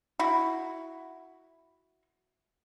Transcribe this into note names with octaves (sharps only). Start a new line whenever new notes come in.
E4 F#4